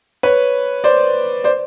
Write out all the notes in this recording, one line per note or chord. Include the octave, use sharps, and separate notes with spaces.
B4 C#5
C5 D5
C5 D5